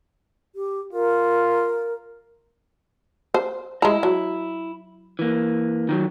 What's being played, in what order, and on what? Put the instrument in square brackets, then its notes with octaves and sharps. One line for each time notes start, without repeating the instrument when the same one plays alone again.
[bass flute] G4
[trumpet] F4 [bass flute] A#4
[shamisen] C5
[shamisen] G#3 A#5 [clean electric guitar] E4
[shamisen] F#3
[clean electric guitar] E3 A#3
D#3 E3 F#3